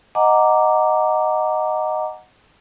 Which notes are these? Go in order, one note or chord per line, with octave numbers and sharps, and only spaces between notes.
D#5 F#5 G#5 A#5 D6